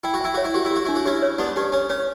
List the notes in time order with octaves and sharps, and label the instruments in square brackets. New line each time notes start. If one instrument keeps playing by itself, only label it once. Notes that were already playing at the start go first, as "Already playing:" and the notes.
[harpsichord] E4 [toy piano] G5
[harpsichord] F#4
[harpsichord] E4 [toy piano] G5
[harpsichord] F#4 [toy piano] C#5
[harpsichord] E4
[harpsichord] F#4 [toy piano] G4
[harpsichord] E4
[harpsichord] F#4 [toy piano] G4
[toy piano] D4 [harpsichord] E4
[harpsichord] F#4
[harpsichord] C#4 E4 [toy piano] G4
[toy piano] C#5
[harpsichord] B3 D4 [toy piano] G4
[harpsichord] C#4 [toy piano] G4
[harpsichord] C#4 [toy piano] G4
[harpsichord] C#4 [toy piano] C#5